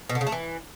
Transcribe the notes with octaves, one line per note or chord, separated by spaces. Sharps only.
B2
D3
C#3
A3
E3